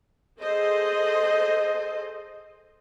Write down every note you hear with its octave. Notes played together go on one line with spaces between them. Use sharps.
G#4 A4 C5 D#5